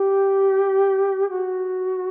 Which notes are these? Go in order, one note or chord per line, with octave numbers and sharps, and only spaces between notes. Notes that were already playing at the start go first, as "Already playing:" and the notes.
Already playing: G4
F#4